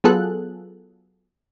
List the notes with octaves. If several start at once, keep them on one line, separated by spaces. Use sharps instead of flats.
F#3 B3 F4 G#4 A4 F#6